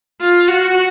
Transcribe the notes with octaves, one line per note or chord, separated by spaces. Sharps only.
F4
F#4